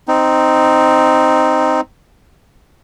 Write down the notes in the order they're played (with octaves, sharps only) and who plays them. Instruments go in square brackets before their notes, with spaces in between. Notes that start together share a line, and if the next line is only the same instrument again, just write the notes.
[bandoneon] C4 D#4